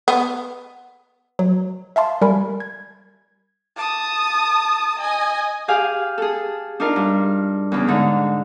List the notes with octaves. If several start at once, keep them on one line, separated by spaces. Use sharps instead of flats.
B3
F#3
E5 F5 A5 C6
G3 A#4 G#5 B5
G#6
A5 D#6
D#5 G#5
G4 G#4 F5 G#5
G#4 A4
D4 D#4 F4 A#4
G2
E2 C#3
G#2 D3 D#4